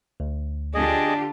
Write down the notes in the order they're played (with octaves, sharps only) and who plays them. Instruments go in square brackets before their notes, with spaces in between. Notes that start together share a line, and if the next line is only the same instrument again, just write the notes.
[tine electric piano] D2
[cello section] D3 F4 G4 [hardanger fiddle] D4 [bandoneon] G#4 D#5